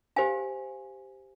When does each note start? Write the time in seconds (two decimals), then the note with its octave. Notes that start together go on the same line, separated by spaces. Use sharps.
0.16 G4 C5 F5 G#5